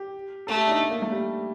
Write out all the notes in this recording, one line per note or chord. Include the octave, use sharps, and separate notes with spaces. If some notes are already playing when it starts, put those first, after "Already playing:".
Already playing: G4
A3 A4
G4
D4
D#4
A#3
A3
G3